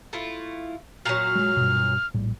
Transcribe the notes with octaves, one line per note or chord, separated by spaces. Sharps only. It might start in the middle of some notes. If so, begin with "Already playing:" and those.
A3 E4 F4
A#2 F#3 F6
G3 G#3
G2 B2
A#1 A2 G3